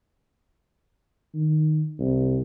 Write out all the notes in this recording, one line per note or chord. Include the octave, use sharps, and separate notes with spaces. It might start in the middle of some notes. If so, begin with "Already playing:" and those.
D#3
C2